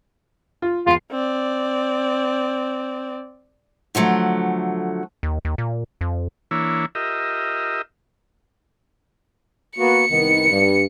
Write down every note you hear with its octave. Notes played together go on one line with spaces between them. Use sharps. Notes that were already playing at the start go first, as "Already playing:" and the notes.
F4
E2 F4 C7
C4 D5
D3 F3 F#3 A3
D#2
D#2
A#2
F2
E3 A#3 D4 E4 C#5
F4 G4 A#4 D#5 E5
A#3 B3 F#4 C#7
C2 D#3 B3
G2